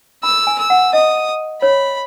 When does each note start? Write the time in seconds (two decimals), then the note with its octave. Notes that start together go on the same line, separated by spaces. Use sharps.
0.23 B5 E6
0.47 G#5
0.58 E6
0.70 F#5
0.93 D#5 D#6
1.62 C#5 B5